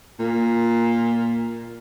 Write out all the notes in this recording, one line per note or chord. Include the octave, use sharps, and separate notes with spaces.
A#2